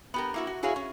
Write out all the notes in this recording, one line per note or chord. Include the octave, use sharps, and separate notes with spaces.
B3 G4 A#4
A#3 E4 F#4
F#4
E4 F#4 G#4 C#5 F5
C#4